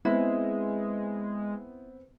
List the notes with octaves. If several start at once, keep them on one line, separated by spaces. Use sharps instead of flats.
G#3 B3 C4 E4